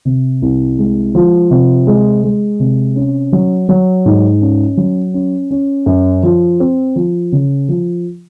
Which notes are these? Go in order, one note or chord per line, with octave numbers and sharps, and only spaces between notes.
C3
C2
G#3
F3
C3
G#3
G#3
C3
C#4
F#3
F#3
G#2
C#4
F#3
C#4
C#4
F#2
F3
C4
F3
C#3
F3